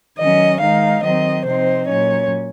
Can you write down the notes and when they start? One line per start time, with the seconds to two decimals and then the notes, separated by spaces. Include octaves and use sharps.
0.18 D#3 F#3 C#4 D#5
0.61 D#3 G#3 D#4 F5
1.02 D#3 F#3 C4 D#5
1.45 C3 F3 C4 D#4 C5
1.88 A#2 F#3 C#4 C#5